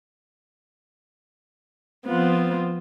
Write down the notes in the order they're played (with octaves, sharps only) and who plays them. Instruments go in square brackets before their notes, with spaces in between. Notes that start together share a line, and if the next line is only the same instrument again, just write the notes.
[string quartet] F3 B3 C4 F4